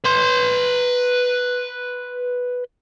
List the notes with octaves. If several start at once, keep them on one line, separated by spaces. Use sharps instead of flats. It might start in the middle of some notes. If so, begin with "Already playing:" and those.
B4 C6